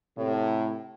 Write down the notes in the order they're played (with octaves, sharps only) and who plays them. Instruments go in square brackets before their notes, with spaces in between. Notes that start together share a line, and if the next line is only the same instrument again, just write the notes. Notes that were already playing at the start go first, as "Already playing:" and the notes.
[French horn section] A2 C3